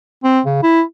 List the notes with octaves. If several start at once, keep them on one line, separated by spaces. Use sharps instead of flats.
C4
C#3
E4